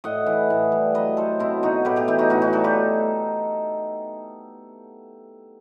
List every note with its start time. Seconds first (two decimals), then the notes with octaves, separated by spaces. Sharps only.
0.04 A2 D#5 F#5
0.26 E3
0.50 A2
0.72 G3
0.94 F#3 B4 D#5
1.17 F#3 A4 C5
1.39 B2 C4 E4
1.63 B2 D#4 F#4
1.85 A2 G4 B4
1.96 G4 B4
2.08 E3 E4 G4
2.19 D#4 F#4
2.30 A2 D#4 F#4
2.42 D#4 F#4
2.53 G3 F#4 A4
2.64 G4 B4